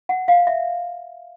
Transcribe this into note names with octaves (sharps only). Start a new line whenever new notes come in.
F#5
F5
E5